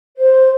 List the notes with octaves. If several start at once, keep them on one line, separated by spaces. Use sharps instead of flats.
C5